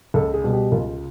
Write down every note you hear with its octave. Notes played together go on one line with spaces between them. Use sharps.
C#2 A4
G#4
B2 G3
G4
C#2 F4